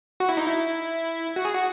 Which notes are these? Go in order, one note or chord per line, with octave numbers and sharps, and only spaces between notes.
F#4
E4
D#4
E4
F#4
G#4
F#4